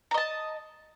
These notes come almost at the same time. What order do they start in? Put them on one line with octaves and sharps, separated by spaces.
A#5 D#5 A5